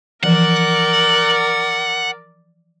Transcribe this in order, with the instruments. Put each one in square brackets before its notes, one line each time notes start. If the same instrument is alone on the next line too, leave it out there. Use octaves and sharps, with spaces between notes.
[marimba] E3 F3 [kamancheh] A#4 D5 [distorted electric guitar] F#5